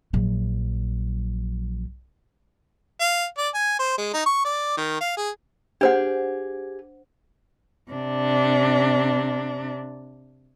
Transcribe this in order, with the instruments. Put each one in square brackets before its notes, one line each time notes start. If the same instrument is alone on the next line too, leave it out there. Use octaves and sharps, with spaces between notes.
[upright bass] A#1 F#3
[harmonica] F5
D5
G#5
C5
G#3
D#4
C#6
D5
D#3
F5
G#4
[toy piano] D4 C5 F#5 [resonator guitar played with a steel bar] G4 G#4
[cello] C3 D4